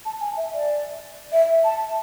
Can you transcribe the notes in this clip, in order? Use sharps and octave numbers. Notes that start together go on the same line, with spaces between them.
A5
G#5
E5
D5
E5
A5